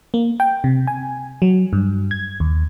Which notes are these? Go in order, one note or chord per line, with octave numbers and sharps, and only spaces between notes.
A#3
G5
C3
G#5
F#3
G2
G#6
D#2